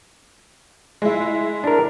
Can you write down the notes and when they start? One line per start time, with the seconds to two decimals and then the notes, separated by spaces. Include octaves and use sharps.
1.02 G#3 E4
1.64 D4 A#4